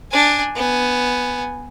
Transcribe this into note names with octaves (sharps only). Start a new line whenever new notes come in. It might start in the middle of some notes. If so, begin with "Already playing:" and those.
D4 G#5
B3 G#5